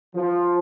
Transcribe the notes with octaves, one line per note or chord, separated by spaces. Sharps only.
F3